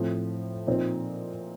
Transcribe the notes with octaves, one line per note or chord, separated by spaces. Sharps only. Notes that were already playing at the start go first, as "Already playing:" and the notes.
Already playing: A2 F3 C4
A#2 F3 C4 D#4